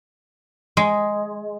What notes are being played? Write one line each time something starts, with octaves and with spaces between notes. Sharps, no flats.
G#3